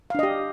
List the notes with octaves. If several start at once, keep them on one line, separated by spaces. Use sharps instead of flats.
D4 G4 D#5 F5